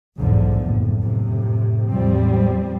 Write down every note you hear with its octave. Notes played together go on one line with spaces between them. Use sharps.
B1 E2 G#2 D3 F3
F#1 A2
F2 A2 C3
E2 A2 F3 G3 C4